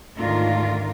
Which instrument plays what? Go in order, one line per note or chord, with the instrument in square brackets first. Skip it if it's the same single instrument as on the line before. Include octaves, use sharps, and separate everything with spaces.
[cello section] D2 G#2 D#3 D4 F4 A#4